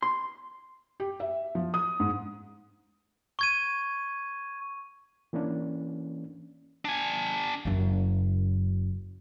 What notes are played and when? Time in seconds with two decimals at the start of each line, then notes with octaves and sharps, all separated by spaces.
0.02 C6
1.00 G4
1.20 E5
1.55 F3
1.74 D#6
2.00 G#2
3.39 C#6 G#6 D#7
5.33 E3 A#3 C#4 D4
6.85 D4 G#5
7.65 F#1 F#2